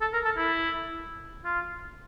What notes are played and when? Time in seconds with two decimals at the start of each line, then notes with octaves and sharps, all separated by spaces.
0.01 A4
0.13 A#4
0.25 A4
0.37 E4
1.45 F4